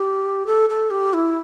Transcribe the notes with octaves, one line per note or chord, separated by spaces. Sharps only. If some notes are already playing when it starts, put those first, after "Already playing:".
Already playing: G4
A4
A4
G4
E4